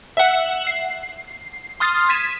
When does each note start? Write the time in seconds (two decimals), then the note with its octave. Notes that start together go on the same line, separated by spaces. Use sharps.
0.17 E5 F#5
0.67 C7
1.80 C6 D#6 F6 A6 C7
2.09 G#6 B6 D#7 E7